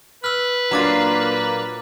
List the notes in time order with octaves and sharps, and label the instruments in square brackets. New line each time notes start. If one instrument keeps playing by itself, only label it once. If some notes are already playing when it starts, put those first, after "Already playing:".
[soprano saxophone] B4 [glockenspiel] E6 F6
[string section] A#2 A#3 [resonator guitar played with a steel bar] F#3 D4 F4 [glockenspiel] A#5 D6 A6